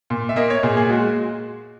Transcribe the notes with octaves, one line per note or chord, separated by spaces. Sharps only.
A#2
E5
A#3 D#5
C#5
A#2 G#4
G#4
G#3 F#4